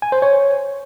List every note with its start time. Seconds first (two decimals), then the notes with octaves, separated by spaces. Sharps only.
0.02 G#5
0.12 C5
0.22 C#5